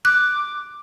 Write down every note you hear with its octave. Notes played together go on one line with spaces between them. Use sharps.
D6 F#6